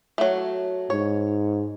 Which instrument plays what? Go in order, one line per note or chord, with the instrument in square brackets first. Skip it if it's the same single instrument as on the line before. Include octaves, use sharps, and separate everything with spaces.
[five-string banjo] F#3 A3
[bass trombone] G#2 [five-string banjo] C#5